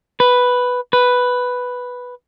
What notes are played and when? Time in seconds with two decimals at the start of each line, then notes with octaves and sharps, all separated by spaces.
0.20 B4
0.93 B4